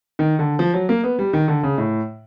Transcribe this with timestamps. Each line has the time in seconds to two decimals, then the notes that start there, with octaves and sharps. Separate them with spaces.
0.19 D#3
0.39 D3
0.59 F3
0.74 F#3
0.89 A#3
1.04 B3
1.19 G3
1.33 D#3
1.48 D3
1.63 C#3
1.78 A2